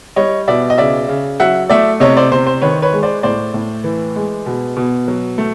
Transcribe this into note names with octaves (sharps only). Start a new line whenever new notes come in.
G3 C#5 D#5
B2 D5 E5
D#5
C#3 D5 E5
C#3
F#3 E5 F#5
A3 D5 E5
C3 C#5 D#5
C5 D5
C3 C5
C5
D#3 B4 C#5
B4 C#5
G#3
C5 D5
A2 C5 D5
A2
E3
G#3
B2
B2
F#3
A3